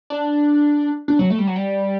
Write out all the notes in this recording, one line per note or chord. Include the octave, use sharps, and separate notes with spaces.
D4
D4
F#3
A3
G3
F#3
G3